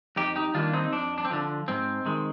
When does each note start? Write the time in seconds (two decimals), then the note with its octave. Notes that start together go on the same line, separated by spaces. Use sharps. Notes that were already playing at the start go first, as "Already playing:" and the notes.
0.16 F2 D#4 G4
0.36 D#4 G4
0.54 D#3 G3 A#3 D4 F4
0.73 C4 D#4
0.92 F2 D4
1.18 D4
1.25 C4
1.30 D3 F3 D4
1.68 G#2 C4
2.06 D#3 G#3